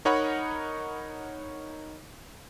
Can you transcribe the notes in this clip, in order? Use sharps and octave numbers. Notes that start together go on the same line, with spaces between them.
D#4 A#4 C#5 D#5 F#5 B5